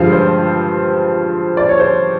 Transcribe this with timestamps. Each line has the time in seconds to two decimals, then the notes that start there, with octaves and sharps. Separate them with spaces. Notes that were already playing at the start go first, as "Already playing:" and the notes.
Already playing: G2 D3 F3 G#3 F5
0.12 C5
1.57 D5
1.69 C#5
1.80 C5